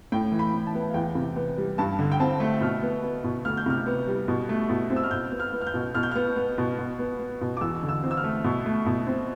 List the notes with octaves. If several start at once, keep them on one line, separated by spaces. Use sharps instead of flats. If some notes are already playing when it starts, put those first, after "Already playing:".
A2 G5
E3
B5
A2
A5
B3
F5
E2 G5
C3
B3
G3
G2 A5
D3
G5
C4 A5
A3
B2 F6
B3
B3
B2
D2 F6
G6
C3 F6
B3
G3
B2
A3
B2
C4
E6
F6
B2 G6
B3
F6
B3
F6
G6
B2
B2 F6
G6
B3 F6
B3
B2
B2
B3
B3
B2
D6
E2 E6
D3
E6
C4
E6
F6
A3
B2
A3
B2
C4